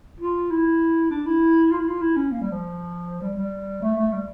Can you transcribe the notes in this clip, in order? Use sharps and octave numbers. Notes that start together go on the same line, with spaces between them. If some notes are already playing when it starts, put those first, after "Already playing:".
F4
E4
D4
E4
F4
E4
F4
E4
C#4
A#3
G3
F3
G3
G3
A3
A3
G3